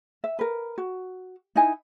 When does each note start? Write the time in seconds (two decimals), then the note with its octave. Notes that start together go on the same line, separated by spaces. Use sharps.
0.24 E5
0.39 A#4 B4
0.78 F#4
1.55 D#4 E4 D#5 G#5